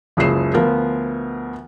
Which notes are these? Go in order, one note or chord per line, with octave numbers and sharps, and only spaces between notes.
F#1 C#2 G#4 C7 E7
D2 F3 B3 A#4